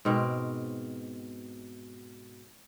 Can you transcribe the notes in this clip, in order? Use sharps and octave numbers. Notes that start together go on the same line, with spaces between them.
G#2 B2 C4 A#4